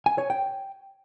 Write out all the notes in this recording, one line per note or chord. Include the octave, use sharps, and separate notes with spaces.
G#5
C#5
G5